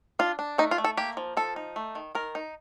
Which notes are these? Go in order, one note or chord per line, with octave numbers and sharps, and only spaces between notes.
D4 F4
D4
A3 D#4
F4
A3
A4
A#3 G4
F3
F3 A4
D#4
A3
D#3
D#3 A#4
D#4